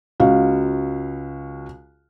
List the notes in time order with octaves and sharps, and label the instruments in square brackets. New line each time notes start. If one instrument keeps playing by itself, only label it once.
[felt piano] C#2 F#4 F5